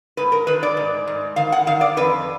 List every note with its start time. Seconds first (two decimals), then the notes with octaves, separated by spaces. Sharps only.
0.17 G#2 B4
0.32 A#4
0.47 D#3 B4
0.63 D5
0.77 G#2
1.07 G#2
1.36 D#3 F5
1.52 F#5
1.67 D#3 F5
1.81 D5
1.97 F2 B4